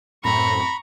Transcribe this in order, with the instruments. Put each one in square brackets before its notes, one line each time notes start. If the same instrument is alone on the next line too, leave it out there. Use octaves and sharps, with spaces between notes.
[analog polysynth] F#2 A2 C4 [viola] A#5 C#6 [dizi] B5